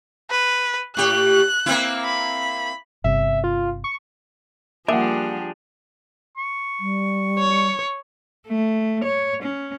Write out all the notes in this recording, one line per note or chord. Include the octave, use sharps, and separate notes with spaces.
B4
A2 G4 F#6
A#3 C4 E4
B5
G1 C3 E5
F4
C#6
F3 G3 A#3 D4 G4 G#4 E5 F#5
C#6
G3
C#5
A3
C#5
C#4